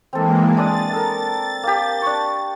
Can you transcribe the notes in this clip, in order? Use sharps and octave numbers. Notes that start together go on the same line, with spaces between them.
E3 G#3 A#3 C4 A4
G#3 D4 D#6 A6
A4 A#4
A#3 G4
D4 C#6